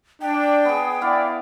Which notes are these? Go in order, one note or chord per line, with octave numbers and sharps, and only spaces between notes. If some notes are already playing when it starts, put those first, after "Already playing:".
D4 G5
B3 G#4
B3 E4 D5 F5